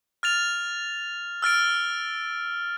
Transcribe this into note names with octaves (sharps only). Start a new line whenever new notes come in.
F6 A6 F7
E6 F6 A6 D7